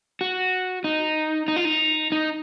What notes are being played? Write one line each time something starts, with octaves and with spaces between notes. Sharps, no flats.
F#4
D#4
D#4
F4
D#4
D#4